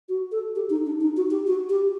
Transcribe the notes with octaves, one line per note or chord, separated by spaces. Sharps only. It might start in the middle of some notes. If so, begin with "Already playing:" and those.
F#4
A4
G4
D#4
D4
D#4
F#4
G4
F#4
G4